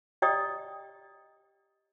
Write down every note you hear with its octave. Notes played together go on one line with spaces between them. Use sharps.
G4 D5 D#5 G5 A#5 D#6